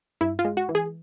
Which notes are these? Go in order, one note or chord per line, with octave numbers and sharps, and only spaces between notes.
G2 E4
F4
G#3
F#4
E3
G#4